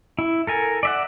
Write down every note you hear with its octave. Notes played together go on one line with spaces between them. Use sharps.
E4
A4 A#4 G#5
D5 E5 F#5